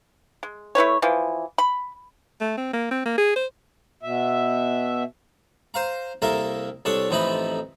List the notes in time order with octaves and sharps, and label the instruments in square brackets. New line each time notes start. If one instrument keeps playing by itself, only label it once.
[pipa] G#3
A3 E4 B4 C#5
E3 F3
B5
[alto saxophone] A3
C4
A#3
C4
A#3
G#4
C5
[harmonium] B2 E5
[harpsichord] C5 F5 A#5
C2 A#3 A4 A#4 E5
C2 D4 A4 C#5 C#6
A1 F2 D#4 E4 E5 B5